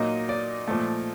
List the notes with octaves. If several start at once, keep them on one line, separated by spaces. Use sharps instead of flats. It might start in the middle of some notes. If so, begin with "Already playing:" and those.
Already playing: A#2 F#3 A#3 D#4 D#5
D5
A#2 F3 A3